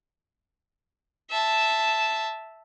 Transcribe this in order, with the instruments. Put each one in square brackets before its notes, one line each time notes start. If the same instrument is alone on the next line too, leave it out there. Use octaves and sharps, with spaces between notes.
[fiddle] E5 A5